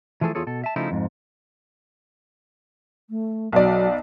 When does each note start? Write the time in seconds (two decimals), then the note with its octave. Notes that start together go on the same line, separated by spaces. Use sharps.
0.21 E3 F3 A3 G#4 A4
0.35 E2 F4 G#4 A4 C#5
0.47 B2 A4
0.64 E5 A5
0.76 C#3 F3 A3 D#4 E4
0.91 F2 G#2
3.10 A3
3.53 B1 F#3 D5